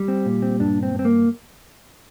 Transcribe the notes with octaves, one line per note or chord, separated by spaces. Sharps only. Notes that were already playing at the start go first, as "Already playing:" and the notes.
Already playing: G3
C4
A#2
C4
G2 D4
C4
G2
C4
A#3